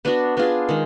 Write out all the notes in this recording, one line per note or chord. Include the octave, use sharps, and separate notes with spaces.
B3 D4 F#4
B3 D4 F4 G#4
D#3 G#3